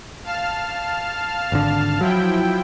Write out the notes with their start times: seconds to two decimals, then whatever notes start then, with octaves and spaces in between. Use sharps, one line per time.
0.24 F5 A5 F6
1.52 G#1 D3
2.01 F3 F#3 E4 G5